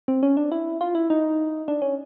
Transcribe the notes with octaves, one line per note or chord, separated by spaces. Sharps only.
C4
C#4
D4
E4
F4
E4
D#4
D4
C#4